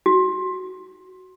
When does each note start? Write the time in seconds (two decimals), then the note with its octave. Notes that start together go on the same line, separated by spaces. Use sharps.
0.06 F#4